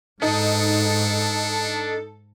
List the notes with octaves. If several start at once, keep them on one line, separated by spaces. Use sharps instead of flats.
G#2 D4 D#4 A4